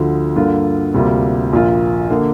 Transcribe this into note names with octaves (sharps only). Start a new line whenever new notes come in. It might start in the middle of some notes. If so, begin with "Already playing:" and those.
Already playing: D2 D3 F3
G2 D3 A#3 F4
D2 C3 G3 A#3 F4
A#1 A#2 A#3 F4
D3 A#3